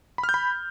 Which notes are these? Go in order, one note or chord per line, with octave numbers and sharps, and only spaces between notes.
B5
F6
G6
B5